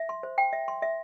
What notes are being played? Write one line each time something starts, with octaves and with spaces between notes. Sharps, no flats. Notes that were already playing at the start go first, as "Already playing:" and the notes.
Already playing: E5
C6
C5
G5
E5
C6
E5